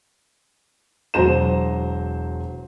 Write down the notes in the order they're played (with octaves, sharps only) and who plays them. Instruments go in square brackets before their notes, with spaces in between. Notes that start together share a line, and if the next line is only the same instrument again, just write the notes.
[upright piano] E1 F#3 C5 A#5 E7